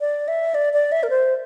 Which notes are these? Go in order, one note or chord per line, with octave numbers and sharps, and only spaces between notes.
D5
E5
D5
D5
E5
A#4
C5